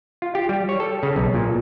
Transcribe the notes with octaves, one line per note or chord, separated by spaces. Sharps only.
F4
G4
G3
C#5
A4
C#3
B1
A#2